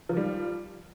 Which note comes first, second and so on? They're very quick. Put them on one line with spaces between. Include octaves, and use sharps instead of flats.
F3 D#3 G3